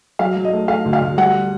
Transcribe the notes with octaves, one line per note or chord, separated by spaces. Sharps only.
F#3 F5
F#3
D#5
A3
A3 F5
D2
F5
D2
G3 F#5